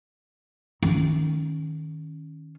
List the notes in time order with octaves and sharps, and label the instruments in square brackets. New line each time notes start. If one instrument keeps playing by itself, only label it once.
[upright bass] D#3 C#4